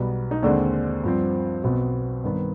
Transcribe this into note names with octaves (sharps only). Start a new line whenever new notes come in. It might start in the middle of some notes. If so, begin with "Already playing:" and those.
Already playing: B1 B2 G3 B3
D#4
D#2 D3 G#3 C4 D4
G2 F3 C4
B1 B2 B3 C4
G2 D#3 B3